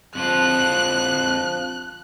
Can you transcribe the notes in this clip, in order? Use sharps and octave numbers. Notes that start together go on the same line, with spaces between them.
F2 D3 F3 C4 F4 F#6